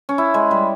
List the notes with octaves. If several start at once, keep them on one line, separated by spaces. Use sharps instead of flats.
C#4
E4
G#3
G3